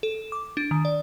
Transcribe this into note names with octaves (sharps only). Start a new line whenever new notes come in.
A4
D6
D4
D#3
D5